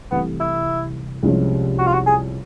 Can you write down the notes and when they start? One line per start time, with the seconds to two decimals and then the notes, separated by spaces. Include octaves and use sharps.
0.11 C2 C3 E3 A3 B3
0.40 E4
1.23 C2 C3 F3 G#3 C#4
1.79 F#4
1.87 F4
1.93 F#4
2.06 G#4